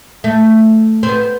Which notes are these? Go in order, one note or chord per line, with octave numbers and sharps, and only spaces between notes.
A3
C4
B3